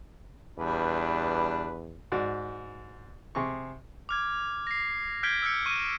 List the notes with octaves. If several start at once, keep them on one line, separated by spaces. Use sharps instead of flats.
E2 G3 D4 B4
G#2 F#4 D5
C3 G#4 C#6
D6 F6 G#6
A#6 C7
F6 G6 G#6 B6 D7 G7
E6 F6 G6 C#7
C#6 F6 D#7